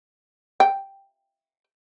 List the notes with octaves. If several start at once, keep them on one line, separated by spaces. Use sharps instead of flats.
G5